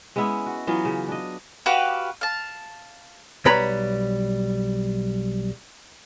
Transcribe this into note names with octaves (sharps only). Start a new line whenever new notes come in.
G#3 B3 C#4 E4
F#4
E3 F#3 B3 F4
C#3
D4 D#5
F#4 G4 B4 F5
F5 A5
B1 G3 B4 C#5 A#5 B5